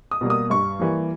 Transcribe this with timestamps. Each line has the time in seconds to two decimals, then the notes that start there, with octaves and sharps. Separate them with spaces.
0.11 D#6
0.21 B2 G3 A#3
0.30 D#6
0.50 G2 C#6
0.80 E3 G3 A#3